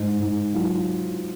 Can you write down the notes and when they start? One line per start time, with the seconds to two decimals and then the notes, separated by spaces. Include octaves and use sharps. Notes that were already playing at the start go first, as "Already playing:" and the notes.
Already playing: G#2 D#4
0.19 G#2
0.54 F#3 F4